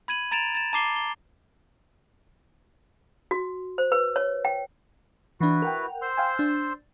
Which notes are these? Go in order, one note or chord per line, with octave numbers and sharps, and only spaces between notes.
B5 G#6 D#7 F#7
A#5 A6 D7 E7 F7
A6 E7
A5 A#5 D6 C7 G7
G7
F#4
C5
B4
C#5
G5
E3 D4 E4 F#4 B4
A#4 F#5 G5
C5 C6 E6
F5 G5 G#5
D4